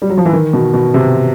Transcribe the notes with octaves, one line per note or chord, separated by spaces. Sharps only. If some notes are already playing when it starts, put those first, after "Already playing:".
G3
F#3
F3
E3
D#3
B2
B2
C3